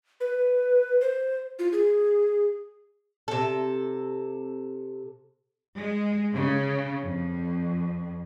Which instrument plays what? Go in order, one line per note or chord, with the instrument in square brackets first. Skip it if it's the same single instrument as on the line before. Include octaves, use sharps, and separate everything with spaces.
[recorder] B4
C5
F4
G#4
[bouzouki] C3 A4
[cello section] G#3
C#3
F2